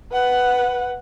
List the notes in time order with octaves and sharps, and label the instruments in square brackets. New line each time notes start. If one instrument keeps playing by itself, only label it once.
[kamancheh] B4 F#5